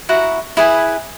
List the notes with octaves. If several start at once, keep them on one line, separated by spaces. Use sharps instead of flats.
E4 F#4 F#5 A#5
E4 G#4 B4 G#5